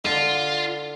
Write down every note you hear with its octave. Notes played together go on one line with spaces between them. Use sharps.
D3 F4